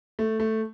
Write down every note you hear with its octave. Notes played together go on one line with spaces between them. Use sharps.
A3
A3